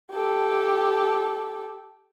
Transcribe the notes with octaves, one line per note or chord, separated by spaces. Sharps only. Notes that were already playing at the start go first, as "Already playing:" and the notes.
G4 A4